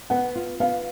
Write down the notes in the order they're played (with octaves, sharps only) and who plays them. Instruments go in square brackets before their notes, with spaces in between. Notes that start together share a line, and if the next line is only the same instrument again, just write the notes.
[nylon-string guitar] B3 [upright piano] F#5
[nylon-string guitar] F4
[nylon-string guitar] B3 [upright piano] F5